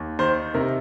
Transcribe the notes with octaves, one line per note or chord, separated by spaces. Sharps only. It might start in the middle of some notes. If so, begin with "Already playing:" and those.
Already playing: D#2
D#3 C5
C3 A#4